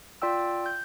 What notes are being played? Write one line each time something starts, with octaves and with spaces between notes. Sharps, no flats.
F4 D5 G5 E6
G6